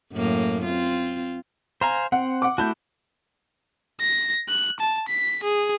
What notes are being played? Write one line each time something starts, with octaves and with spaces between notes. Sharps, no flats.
F#2 A2 A#3
C4 F4
C5 F5 G#5 A#5
C4 F#5
F#5 D6
A3 E4 F#4 A5 G6
A#6
F#6
A5
B6
G#4